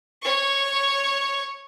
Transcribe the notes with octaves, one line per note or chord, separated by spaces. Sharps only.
C#5 C#6